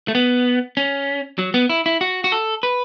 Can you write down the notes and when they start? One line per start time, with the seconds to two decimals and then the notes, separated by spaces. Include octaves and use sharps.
0.08 A3
0.15 B3
0.77 C#4
1.38 F#3
1.54 B3
1.70 E4
1.86 E4
2.01 F#4
2.24 F#4
2.32 A4
2.63 B4